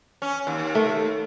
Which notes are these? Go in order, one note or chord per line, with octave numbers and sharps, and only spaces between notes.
C#4
D#2
A3